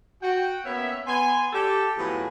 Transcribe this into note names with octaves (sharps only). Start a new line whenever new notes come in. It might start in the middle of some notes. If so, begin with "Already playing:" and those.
F#4 G5
A#3 B3 C#4 C#5 E5
B3 G#5 C6
G4 A4
A2 F3 F#3 B3 G#4